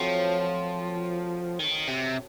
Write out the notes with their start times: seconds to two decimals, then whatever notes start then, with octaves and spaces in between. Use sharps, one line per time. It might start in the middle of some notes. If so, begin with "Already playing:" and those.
Already playing: F3 F#3 A3 C4
1.59 D#3
1.88 C3